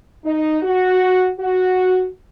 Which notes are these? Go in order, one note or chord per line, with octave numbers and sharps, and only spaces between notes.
D#4
F#4
F#4